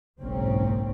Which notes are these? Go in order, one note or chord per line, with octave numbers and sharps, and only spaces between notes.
F#1 B1 G#2 C4 C#4